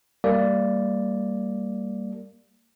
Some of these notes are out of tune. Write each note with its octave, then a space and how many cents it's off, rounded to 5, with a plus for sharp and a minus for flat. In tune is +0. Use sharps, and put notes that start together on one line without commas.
G3 +0 A#3 -20 D5 +0